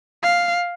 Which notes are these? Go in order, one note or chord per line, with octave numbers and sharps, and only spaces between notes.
F5